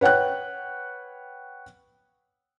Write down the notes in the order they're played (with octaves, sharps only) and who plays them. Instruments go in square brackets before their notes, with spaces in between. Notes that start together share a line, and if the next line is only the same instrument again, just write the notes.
[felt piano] B4 C#5 F#5 G5 F#6